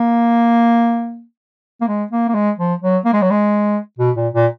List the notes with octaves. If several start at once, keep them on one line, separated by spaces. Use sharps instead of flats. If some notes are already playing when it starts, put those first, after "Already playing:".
Already playing: A#3
A#3
G#3
A#3
A#3
G#3
F3
F#3
A#3
G#3
F#3
G#3
B2
A#2
A#2